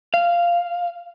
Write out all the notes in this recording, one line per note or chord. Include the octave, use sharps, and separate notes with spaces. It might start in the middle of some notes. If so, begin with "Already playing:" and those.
F5